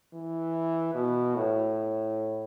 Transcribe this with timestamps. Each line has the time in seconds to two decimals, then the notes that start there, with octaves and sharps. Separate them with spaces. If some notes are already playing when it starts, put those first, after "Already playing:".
0.13 E3
0.94 B2
1.35 A2